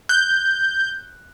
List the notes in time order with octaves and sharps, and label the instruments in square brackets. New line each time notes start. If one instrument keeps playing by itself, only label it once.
[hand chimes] F#6 [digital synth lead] G6